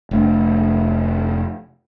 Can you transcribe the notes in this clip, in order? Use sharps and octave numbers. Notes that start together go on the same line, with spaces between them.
F1 A3 D4